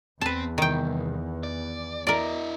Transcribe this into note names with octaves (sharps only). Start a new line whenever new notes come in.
E2 C4 B4 A5
C2 D#3 G5
D5
E4 A#4 D5 D#5